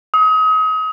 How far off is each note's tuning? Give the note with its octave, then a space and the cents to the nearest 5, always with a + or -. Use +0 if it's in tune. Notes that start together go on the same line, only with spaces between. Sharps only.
D#6 +35